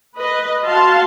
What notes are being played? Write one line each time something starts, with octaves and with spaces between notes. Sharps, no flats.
B4 D#5
F#4 F5 A5 C6